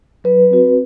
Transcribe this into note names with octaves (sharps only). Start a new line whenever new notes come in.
F#3 B4
C4 F#4